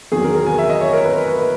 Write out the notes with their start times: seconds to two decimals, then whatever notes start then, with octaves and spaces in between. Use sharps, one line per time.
0.12 E2 D#3 F#3 G#4
0.23 A#4
0.35 A#4
0.46 G#5
0.58 E5
0.70 D#5
0.81 C#5
0.93 A#4
1.04 B4
1.28 B4